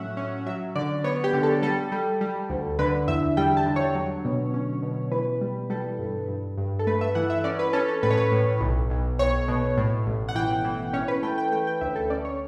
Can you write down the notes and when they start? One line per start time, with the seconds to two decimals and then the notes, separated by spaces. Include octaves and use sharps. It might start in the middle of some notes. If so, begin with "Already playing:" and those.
Already playing: A2 F#3 C#4 E5 F#5
0.17 C#4
0.46 F#3 E5
0.75 D3 D5
1.04 B3 C#5
1.24 G4
1.33 D3
1.43 A4
1.62 G3 A4
1.92 G3
2.21 G3
2.50 D2
2.79 D3 B4
3.08 E2 E5
3.37 G3 G5
3.57 A5
3.66 D3
3.76 C#5
3.95 F#3
4.25 B2
4.54 C#4
4.83 B2
5.11 E3 B4
5.41 G3
5.70 G3 A4
5.99 G2
6.28 G2
6.57 G2
6.79 A4
6.87 A3 B4
7.01 E5
7.15 E3 F#5
7.30 E5
7.44 C#4 D5
7.59 B4
7.73 C#4 A4
7.88 A4
8.03 A2 B4
8.10 C#5
8.17 B4
8.32 A2
8.61 B1
8.90 B1
9.19 B1 C#5
9.48 B2
9.77 A2
10.06 A1
10.29 F#5
10.35 E3 G5
10.65 E3
10.93 C#4 C#5
11.08 B4
11.23 A3 G5
11.38 G5
11.52 A3 G5
11.67 G5
11.81 D2 E5
11.96 A4
12.10 C#4 D5
12.25 C#5